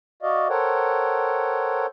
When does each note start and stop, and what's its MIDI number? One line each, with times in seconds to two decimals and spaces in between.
0.22 0.48 66
0.22 0.48 74
0.22 0.48 75
0.22 0.48 77
0.49 1.86 69
0.49 1.86 70
0.49 1.86 72
0.49 1.86 73
0.49 1.86 78
0.49 1.86 79